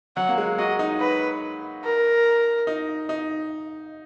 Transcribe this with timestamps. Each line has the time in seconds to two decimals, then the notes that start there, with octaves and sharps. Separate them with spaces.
0.16 F#3 F#5
0.28 A#3
0.38 G#3
0.58 F#4 D#5
0.79 D#4
1.00 B4
1.84 A#4
2.67 D#4
3.09 D#4